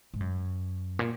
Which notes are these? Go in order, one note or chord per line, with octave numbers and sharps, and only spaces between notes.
G#2
F#2
A#2